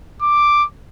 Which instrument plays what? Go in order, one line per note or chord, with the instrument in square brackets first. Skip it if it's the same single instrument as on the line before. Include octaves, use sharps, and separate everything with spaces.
[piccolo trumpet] D6